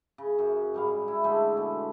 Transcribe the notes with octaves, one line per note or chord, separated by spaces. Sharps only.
C#3
F#2 F#4
G#2 G3 F5
E4
D3 G#3 A3 B5
B2